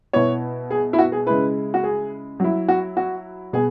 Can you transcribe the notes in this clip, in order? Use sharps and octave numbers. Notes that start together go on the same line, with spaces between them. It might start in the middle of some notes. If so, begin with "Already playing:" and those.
B2 B3 E4 C#5
G#4
E4
F#4
G#4
C#3 G#3 E4 B4
F#4
G#4
F#3 E4
F#4
F#4
B2 B3 G#4